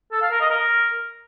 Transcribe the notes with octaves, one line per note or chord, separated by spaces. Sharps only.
A4
F5
A#4
D#5
A#4